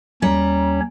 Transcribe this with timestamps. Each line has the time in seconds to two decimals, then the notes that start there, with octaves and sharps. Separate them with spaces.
0.22 D#2 G3 C#4 C#5 A#5